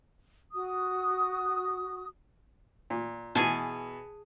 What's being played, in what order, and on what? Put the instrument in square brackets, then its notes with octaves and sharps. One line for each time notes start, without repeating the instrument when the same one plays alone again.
[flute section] F#4 D#6
[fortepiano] A#2
[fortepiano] B2 E3 [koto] G#4 G#5 A5